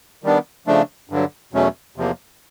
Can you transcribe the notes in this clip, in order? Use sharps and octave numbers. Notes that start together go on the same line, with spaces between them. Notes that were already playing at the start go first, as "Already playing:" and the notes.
D#3 G3 B3 D4
C#3 F3 A3 D4
G2 D3 F#3
E2 B2 F#3 A3 C#4
E2 C3 F3 A#3